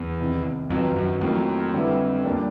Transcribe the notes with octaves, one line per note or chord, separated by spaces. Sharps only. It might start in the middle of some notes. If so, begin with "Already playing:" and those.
Already playing: E2
C2 C3 D#3
F2 D#3 F#3 B3 D#4
F#2
F2 A2 F#3 A#3
D3 G3 B3 E4
A#2 G3 A#3 D4